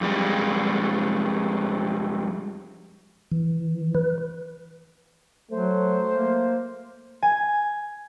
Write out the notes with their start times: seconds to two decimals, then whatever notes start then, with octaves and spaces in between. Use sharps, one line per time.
0.01 F2 G3 G#3
3.32 E3
3.95 B4
5.51 F#3 A3 C5
6.13 A#3
7.22 G#5